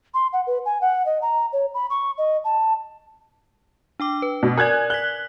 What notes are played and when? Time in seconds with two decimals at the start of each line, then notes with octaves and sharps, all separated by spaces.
0.14 C6
0.33 F#5
0.47 B4
0.65 G#5
0.81 F#5
1.06 D#5
1.22 A#5
1.53 C#5
1.74 B5
1.90 C#6
2.18 D#5
2.44 A5
4.00 D4 G5 D6
4.22 B4
4.43 B2
4.58 A#4 D5 G#5 F#6 G#6
4.90 F#6 B6 G7